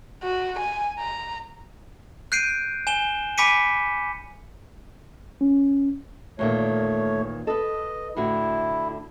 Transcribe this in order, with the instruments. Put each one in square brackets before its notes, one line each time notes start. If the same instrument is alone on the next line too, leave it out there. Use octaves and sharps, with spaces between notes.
[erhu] F#4
G#5
A#5
[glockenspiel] F#6 G6 C7 D7 D#7
G#5 E7 G7
G#5 B5 D6 B6 C#7 D#7
[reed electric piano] C#4
[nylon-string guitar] E2 A#2 D#3 [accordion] A3 C#5
[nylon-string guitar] A4 B4 [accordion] D#5
[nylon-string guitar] A2 D3 F#4 [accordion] E4